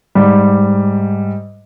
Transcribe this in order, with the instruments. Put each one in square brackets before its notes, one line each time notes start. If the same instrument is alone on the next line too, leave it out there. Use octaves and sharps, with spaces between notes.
[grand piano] G#2 G3